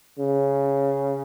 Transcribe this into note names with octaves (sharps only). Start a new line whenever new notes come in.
C#3